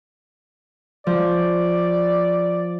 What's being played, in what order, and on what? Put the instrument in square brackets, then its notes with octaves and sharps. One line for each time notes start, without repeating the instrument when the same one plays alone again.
[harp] F3 [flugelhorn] D5